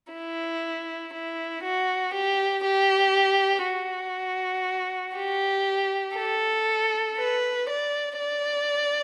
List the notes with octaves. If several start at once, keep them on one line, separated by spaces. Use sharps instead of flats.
E4
E4
F#4
G4
G4
F#4
G4
A4
B4
D5
D5